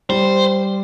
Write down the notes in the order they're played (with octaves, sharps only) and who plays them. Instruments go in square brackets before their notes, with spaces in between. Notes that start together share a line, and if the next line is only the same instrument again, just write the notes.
[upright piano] G3 [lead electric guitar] C5